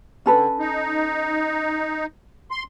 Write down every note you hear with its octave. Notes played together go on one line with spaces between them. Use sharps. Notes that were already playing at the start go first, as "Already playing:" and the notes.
D3 C#4 A4 B4
D#4
C6